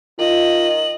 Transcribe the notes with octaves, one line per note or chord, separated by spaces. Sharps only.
D#3 F4 D#5 F#7